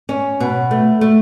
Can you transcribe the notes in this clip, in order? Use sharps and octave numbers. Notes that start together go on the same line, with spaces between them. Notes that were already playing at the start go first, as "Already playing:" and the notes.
C#4
B2
A3
A3